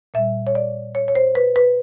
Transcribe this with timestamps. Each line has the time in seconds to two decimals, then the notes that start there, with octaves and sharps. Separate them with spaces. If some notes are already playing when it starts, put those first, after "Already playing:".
0.14 A#2 G3 E5
0.47 C#5
0.55 D5
0.95 C#5
1.08 C#5
1.15 C5
1.35 B4
1.56 B4